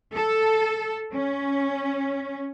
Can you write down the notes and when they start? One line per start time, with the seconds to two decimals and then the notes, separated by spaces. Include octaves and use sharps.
0.16 A4
1.12 C#4